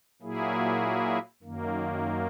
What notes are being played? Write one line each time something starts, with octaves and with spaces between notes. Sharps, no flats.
A#2 F#3 A#3 E4 G#4
F#2 D#3 A#3